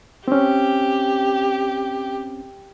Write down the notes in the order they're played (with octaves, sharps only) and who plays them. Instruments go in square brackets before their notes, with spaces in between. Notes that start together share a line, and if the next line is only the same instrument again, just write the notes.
[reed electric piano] C4 C#4 [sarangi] G4